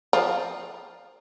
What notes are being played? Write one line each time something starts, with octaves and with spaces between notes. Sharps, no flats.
F3